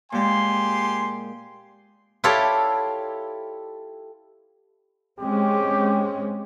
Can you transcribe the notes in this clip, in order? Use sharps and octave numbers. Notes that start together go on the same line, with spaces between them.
A#2 G#3 G4 G#5 C6
E4 F4 G4 A4 C#5 D5
G#3 C4 C#4 G4